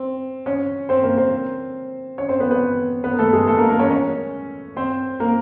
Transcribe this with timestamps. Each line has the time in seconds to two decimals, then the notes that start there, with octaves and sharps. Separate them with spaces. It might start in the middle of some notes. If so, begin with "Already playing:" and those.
Already playing: C4
0.46 C#4 C#5
0.89 C4 C5
1.03 A#3 A#4
1.18 C4 C5
2.18 C#4 C#5
2.29 C4 C5
2.40 B3 B4
2.51 B3 B4
3.04 B3 B4
3.13 A#4
3.19 A3 A4
3.33 G#3 G#4
3.47 A3 A4
3.58 A#3 A#4
3.68 A#3 A#4
3.79 C#4 C#5
3.90 C#4 C#5
4.77 C4 C5
5.20 A#3 A#4